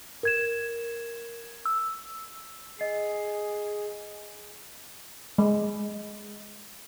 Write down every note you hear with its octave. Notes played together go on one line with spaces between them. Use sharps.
A#4 G#6 E7
E6
G#4 D#5 C7
G#3